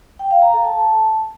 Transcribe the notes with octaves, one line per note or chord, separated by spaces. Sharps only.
G5
F5
A#5
A4
A5